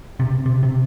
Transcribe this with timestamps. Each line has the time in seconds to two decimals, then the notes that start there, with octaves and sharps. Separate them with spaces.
0.20 C3
0.46 C3
0.63 C3